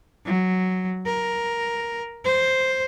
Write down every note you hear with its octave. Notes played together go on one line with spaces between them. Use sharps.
F#3
A#4
C5